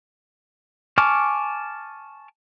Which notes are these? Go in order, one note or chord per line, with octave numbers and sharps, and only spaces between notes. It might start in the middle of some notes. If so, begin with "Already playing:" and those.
G#5 A5 C#6 D6 F6